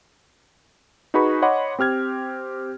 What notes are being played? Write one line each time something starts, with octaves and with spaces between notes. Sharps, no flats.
D#4 F#4 G#4 B4 B5 C#6
C#5 D#5 F#5 B5 C6 D6
C4 G4 F6 G#6